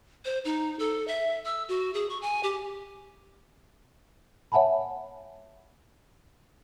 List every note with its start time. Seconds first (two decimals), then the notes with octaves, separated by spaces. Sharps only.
0.25 C5
0.45 D#4
0.79 A4
1.08 E5
1.45 E6
1.69 F#4
1.94 G#4
2.09 C#6
2.22 G#5
2.43 G4
4.52 C#5 E5 F#5 G#5 A5 B5